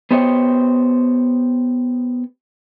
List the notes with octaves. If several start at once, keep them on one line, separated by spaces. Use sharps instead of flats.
B3 G4 C5 C#5 D#5